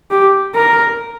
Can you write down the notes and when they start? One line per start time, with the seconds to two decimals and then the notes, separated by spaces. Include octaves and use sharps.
0.11 G4
0.55 A#4